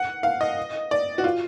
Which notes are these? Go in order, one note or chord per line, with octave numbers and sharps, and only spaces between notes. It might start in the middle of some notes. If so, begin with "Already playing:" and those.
Already playing: F#5
F5
D#5
D5
F#4
F4